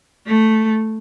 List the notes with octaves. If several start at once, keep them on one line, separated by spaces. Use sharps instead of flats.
A3